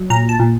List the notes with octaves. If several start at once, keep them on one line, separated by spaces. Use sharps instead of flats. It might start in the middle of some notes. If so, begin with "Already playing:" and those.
Already playing: F#3
A#2 A#5
A5
A#2